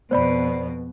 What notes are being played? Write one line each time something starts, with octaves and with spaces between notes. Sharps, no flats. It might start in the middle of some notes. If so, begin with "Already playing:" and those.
F2 B2 B3 C5 D5 B5